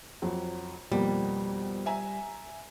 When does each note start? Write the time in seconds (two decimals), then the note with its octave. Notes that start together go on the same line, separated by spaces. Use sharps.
0.22 F2 F#3
0.92 F2 B2 G3 A#3
1.86 E5 G#5 A#5